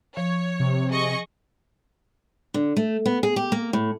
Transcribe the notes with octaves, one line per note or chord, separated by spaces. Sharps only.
F3 C#5
C3
G#4 D#5 C#6
D3
A3
B3
G#4
G4
A#3
A2